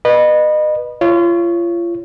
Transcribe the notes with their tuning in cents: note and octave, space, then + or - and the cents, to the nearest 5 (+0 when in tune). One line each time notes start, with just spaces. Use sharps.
B4 -15 D#5 -30
F4 -30 C#5 +0